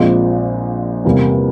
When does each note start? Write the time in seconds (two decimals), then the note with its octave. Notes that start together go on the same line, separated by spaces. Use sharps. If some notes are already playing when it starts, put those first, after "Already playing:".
Already playing: A#1 A#2 G#3 C4 F4
1.04 E2 C3 G3 A#3